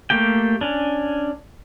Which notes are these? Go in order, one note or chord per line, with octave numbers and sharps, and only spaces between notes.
A3 A#3 G4 G5
C#4 D4